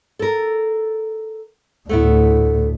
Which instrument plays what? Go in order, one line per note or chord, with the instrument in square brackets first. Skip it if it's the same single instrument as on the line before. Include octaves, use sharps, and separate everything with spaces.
[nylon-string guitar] A4 A#4
[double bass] D2 A2 [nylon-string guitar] A3 B3 E4